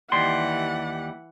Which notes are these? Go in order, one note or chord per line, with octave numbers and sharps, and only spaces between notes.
D#2 E3 G3 F#5 C6